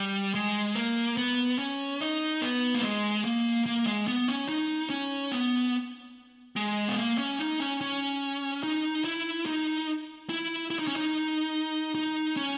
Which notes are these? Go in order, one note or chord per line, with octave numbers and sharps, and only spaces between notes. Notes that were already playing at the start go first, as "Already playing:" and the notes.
Already playing: G3
G#3
A#3
B3
C#4
D#4
B3
A#3
G#3
A#3
A#3
G#3
B3
C#4
D#4
C#4
B3
G#3
B3
A#3
C#4
D#4
C#4
C#4
D#4
E4
D#4
E4
E4
D#4
C#4
D#4
D#4
C#4